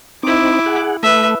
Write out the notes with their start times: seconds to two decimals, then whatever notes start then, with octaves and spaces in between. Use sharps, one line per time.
0.23 C4 D#4 E4 D6
0.66 G#4 F#5
1.03 A3 B4 E5